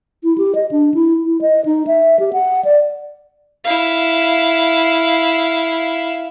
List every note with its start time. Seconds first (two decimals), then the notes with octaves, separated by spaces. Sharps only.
0.23 E4
0.38 G4
0.55 D#5
0.71 D4
0.94 E4
1.24 E4
1.41 D#5
1.65 D#4
1.87 E5
2.20 G4
2.33 F#5
2.65 D5
3.64 E4 F5